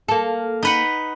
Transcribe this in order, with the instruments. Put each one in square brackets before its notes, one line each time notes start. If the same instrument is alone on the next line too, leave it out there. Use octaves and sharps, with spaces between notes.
[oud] A#3 A4
[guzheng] D#4 B4 F#5